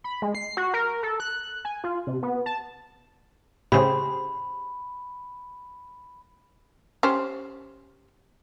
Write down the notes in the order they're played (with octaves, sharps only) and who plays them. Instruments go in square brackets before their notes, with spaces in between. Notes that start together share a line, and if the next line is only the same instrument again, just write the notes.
[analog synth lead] B5
G#3
C7
F#4
A#4
A4
F#6
G#5
F4
C3
B3
A5
[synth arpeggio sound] A2 C#3 [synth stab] G4 G#4 C5 [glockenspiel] B5
[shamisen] C#4 G4 C5